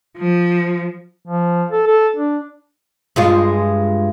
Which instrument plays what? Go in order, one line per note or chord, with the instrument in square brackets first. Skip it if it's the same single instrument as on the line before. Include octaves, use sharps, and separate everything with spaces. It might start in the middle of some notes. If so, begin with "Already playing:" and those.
[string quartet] F3
[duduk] F3
A4
A4
D4
[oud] G2 G#3 F4